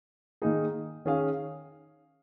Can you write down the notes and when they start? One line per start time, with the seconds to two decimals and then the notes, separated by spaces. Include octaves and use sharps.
0.42 D#3 A#3 D#4 G#4
1.05 D#3 C#4 G#4 F5